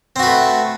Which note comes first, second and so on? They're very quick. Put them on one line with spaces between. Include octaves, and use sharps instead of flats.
C4 F#4 B4 A3